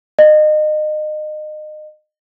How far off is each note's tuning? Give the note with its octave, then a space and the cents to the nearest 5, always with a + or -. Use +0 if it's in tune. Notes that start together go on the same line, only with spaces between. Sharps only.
D#5 -30